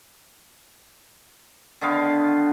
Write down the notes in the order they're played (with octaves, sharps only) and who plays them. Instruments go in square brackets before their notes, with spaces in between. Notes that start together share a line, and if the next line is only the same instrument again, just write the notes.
[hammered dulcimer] D3 D#3 B3 F5